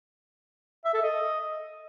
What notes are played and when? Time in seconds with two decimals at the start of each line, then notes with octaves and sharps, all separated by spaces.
0.85 E5
0.94 A4
1.02 D#5